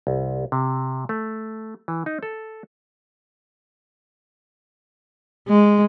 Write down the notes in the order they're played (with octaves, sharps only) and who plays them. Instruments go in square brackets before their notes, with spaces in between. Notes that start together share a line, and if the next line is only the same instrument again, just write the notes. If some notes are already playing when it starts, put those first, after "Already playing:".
[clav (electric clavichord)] C2
C3
A3
E3
D#4
A4
[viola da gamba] G#3